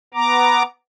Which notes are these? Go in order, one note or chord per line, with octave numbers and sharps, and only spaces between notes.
B3 A#5 D6